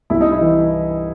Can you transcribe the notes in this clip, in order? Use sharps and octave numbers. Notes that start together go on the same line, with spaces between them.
C2 E4
D#4
E4
E3